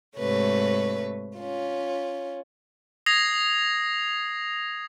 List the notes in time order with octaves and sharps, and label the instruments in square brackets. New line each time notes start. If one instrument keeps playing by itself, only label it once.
[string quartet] G#2 C3 A3 B4 C#5
C#4 F4
[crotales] D#6 G#6 A#6 C7 F7